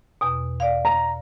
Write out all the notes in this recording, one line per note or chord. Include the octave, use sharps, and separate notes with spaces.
E2 B2
D5 F5
A#5